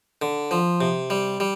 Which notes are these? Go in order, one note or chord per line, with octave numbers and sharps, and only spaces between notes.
D3
F3
C3
G3
G3